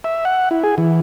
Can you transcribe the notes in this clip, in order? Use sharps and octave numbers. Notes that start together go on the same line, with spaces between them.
E5
F#5
E4
G#4
E3